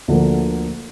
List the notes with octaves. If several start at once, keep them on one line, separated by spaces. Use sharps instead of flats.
D2 D3 F3 A#3